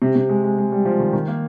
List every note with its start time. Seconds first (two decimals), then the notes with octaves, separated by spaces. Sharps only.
0.02 C3
0.16 C3
0.29 G#3
0.44 G#3
0.58 G#3
0.72 G3
0.85 F3
1.00 D#3
1.13 D#3
1.28 A#3